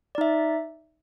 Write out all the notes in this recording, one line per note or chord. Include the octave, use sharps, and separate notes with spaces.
D#4 D5 E5